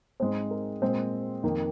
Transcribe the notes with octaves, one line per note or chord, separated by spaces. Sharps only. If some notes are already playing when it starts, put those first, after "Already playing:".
G#2 G#3 C4 C5
A#4
A#2 G#3 C4 C5
F2 D#3 A#3